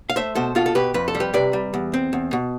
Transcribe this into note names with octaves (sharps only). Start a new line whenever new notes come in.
F5
A3 C5 E5
B2 A4 C5
B2 F4 A4
A4
B2 G4 B4
F2 B4
A4
G3
G4 B4
C3 B4 D5
G3
E2
C4
E2
B2